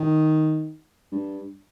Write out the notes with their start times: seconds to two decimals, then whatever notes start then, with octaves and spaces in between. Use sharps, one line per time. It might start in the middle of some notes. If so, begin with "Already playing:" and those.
Already playing: D#3
1.12 G2